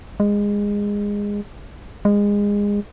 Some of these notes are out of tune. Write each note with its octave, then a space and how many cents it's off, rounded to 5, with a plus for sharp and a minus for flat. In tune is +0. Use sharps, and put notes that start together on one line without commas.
G#3 -20
G#3 -25